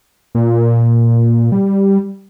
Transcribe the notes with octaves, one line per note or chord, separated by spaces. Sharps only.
A#2
G3